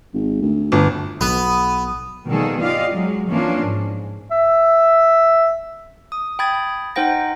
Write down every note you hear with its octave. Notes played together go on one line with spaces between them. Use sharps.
G#1
D2
G1
B1 B3 D#6
B2 D#3 G3 A#3 G#4 A4
F4 G4 D5 D#5 F5
F#3 G#3
E3 F3 A#3 C#4 D4 F4
G#2
E5
D#6
G5 B5 D#6 G#6 A6
D#4 C5 F#5 G5 A#6